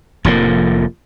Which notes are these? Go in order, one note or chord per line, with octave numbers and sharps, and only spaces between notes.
F1 A2 F3 A#3